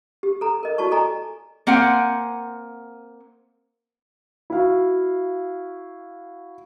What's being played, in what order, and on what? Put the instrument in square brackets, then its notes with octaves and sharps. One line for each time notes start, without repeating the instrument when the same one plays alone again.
[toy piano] G4
A4 A#5
A#4 D#5
E4 F#4 D5 A5 C#6
A4 D#5 G#5 A#5
[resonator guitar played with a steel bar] A#3 C4 F#5 G#5
[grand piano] E4 F#4 F5